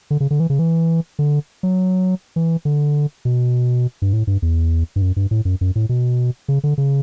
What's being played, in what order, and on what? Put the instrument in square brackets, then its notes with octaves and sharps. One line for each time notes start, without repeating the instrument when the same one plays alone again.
[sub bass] D3
C#3
D3
E3
C#3
E3
D3
F#3
E3
D3
B2
G2
A2
G2
E2
G2
F#2
G2
A2
F#2
F#2
A2
B2
C#3
D3
C#3